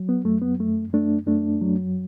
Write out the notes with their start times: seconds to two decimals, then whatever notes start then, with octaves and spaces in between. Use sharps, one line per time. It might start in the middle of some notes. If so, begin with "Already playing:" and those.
Already playing: F#3
0.09 B3
0.25 F#2 A3
0.42 B3
0.60 F#2 A3
0.93 F#2 A3 D4
1.27 F#2 A3 D4
1.61 F#3